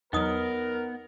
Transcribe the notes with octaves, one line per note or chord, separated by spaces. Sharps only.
E2 F#3 B3 D#4 A#4 D#5 D#6